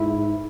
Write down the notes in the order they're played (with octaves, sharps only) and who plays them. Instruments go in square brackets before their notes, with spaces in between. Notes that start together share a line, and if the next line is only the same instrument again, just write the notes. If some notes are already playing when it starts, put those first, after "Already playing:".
Already playing: [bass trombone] G#2 [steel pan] E4